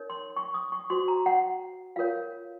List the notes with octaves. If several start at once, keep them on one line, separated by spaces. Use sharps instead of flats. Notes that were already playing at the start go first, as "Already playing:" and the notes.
Already playing: D#4 A#4 C#5
C6
C#6
D#6
C#6
F#4 C5 C6
A#5
F#5
F4 A#4 C#5 F5